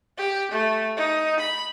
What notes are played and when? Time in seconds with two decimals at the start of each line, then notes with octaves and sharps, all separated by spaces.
0.18 G4
0.52 A3
0.97 D#4
1.40 B5